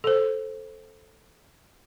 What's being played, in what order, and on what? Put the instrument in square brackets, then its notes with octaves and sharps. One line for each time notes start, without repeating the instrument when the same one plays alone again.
[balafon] A4 C5